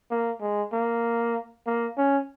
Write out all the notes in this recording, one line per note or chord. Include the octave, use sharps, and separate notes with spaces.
A#3
G#3
A#3
A#3
C#4